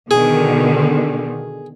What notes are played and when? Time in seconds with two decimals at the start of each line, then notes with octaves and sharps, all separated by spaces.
0.11 B2 D3 D#3 G#4